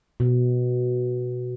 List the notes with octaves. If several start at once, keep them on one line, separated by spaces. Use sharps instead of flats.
B2